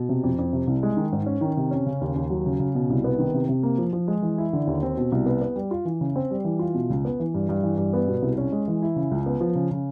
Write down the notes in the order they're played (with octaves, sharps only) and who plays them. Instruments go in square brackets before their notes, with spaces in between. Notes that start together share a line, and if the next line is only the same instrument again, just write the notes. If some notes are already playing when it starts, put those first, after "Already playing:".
Already playing: [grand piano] B2
C3
F2
F2
C3
C2
G#3
D#3
G#2
C#4
D#3
C3
C#4
C#3
D#2
D#2
F#3
C#3
C#3
B2
C2
B3
D#3
C3
C3
A#3
F3
F3
G#3
E3
E4
D3
D#2
C4
B2
C2
B3
B3
G3
F4
E3
C#3
C4
G3
E3
F4
B2
C#2
B3
E3
G2
G2
E3
G2
B3
B2
C2
C#4
G#3
E3
E4
C#3
C#2
B3
F3
C#3
C#3